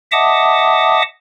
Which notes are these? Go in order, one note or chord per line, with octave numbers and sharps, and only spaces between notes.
D#5 E5 F#5 A5 D6 D#6